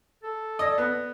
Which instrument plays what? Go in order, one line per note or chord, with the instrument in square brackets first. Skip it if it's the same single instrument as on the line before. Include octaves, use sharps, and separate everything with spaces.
[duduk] A4
[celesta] D5 A#6 [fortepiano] D#5
[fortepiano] B3